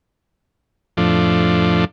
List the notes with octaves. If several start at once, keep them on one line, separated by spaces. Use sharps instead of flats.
F2 A2 F3 D4